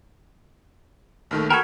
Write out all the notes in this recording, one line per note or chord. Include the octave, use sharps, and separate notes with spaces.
A#1 D#3 A3
F#4 A4 A#4 G5 B5 G#6